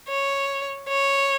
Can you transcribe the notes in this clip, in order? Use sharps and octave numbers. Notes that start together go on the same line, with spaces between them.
C#5
C#5